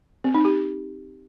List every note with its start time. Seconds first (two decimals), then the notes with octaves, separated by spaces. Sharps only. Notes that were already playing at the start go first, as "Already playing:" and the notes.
0.24 C4
0.35 D#4
0.45 G4